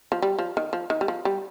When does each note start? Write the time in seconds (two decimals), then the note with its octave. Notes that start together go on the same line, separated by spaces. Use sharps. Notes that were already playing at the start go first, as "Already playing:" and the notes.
0.12 F3
0.22 G3
0.39 F3
0.57 D#3
0.73 F3
0.90 D#3
1.01 G3
1.08 F3
1.25 G3